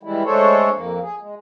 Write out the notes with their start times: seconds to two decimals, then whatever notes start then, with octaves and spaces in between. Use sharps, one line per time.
0.03 E3 G3 G#3 E4
0.25 G#3 A3 D4 A4 C5 C#5
0.72 F2 A#3
1.02 G#4
1.21 G#3